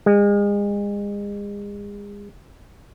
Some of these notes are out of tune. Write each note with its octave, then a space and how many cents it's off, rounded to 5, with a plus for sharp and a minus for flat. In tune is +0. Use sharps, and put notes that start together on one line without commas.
G#3 -35